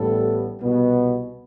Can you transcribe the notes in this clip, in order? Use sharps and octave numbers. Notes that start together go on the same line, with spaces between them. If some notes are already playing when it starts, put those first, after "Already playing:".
Already playing: A1 A2 G3 B3 A4
C2 B2 B3